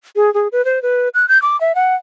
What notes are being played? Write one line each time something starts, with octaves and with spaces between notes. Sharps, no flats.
G#4
G#4
B4
C5
B4
F#6
G6
D6
E5
F#5